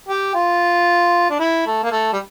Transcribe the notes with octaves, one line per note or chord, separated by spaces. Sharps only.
G4
F4
D4
E4
A3
A#3
A3
G3